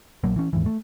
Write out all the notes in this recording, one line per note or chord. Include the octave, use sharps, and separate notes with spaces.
A#1 F#3 A#3
E3 C#4
D#2 G#2 E3
A3